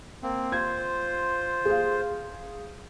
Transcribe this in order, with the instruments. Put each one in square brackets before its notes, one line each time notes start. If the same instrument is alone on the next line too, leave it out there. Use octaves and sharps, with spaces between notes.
[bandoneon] A#3 C4
[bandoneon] F4 C5 [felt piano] G#6
[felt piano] G#4 F5